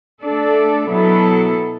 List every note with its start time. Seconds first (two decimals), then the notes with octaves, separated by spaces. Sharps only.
0.23 A3 D4 A4 D5
0.90 B2 F#3 B3 E4 A4